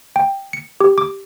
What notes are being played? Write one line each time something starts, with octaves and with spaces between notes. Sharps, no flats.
G5
C#7
G4
D6